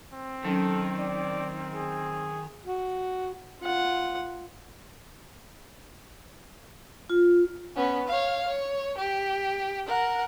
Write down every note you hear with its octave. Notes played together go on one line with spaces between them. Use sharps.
C4
D#3 F#3 C#4 A4
D5
G#4
F#4
F4 F#5
F4
B3 C#4
C#5 F5
C#5
G4
A#4 F#5